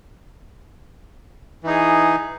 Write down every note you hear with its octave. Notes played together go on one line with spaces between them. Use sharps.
E3 D#4 G#4